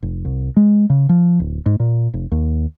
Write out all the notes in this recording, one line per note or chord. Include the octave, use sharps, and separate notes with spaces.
F1
C2
G#3
C#3
F3
D1
G#2
A#2
F1
D#2